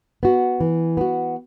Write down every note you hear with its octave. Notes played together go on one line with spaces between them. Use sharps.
B3 F#4
E3
B3 F#4